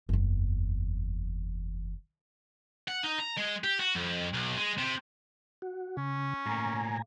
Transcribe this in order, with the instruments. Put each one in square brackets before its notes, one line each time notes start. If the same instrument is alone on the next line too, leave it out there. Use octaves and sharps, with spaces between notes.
[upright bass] F#1 E2
[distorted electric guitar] F#5
D#4
A#5
G#3
G4
F#4
F2
B1
G#3
C3
[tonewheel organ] F#4
[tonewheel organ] C#3 [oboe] C#4
[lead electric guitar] A2 A#3 [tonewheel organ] G#5 A#5